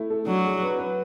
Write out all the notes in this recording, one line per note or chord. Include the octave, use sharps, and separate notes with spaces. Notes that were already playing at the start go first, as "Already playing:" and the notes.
Already playing: A3 E4
A4
F#3 D4
G#4
B4
B4